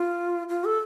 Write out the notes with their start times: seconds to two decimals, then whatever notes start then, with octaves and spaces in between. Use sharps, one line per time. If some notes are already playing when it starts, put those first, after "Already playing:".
Already playing: F4
0.49 F4
0.65 A4